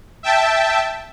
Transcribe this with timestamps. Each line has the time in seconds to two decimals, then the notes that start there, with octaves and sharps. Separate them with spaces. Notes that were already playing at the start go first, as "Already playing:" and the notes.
0.23 E5 G5 A5